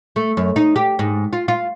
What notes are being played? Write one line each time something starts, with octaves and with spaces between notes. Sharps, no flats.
A3
F#2
D#4
G4
G#2
F4
F4